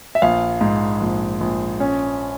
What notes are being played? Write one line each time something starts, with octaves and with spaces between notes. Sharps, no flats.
E5
A#1 F5
G#2
A#1
A#1
C#4